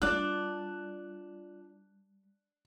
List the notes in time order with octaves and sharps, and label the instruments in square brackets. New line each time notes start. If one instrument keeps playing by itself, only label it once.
[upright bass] G3 [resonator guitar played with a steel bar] D4 [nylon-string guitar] F4 D5 [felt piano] F#6